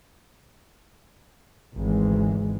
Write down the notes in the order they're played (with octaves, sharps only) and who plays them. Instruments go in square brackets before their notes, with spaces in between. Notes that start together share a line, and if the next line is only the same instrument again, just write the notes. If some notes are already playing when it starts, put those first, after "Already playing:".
[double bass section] G#1 D2 E3 G#3